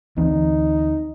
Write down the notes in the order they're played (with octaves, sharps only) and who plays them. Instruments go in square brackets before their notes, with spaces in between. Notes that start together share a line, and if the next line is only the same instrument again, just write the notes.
[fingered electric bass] D2 E3 C4 [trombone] D#4